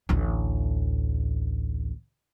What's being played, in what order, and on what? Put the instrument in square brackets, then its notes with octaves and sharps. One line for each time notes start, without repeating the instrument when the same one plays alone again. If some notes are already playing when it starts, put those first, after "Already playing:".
[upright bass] A1 D2